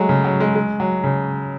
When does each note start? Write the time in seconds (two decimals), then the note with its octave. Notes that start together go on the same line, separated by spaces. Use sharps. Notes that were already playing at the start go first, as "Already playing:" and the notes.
Already playing: F#3 G#3 A3
0.09 C#3
0.24 F#3
0.40 G#3
0.55 G#3
0.80 F#3
1.04 C#3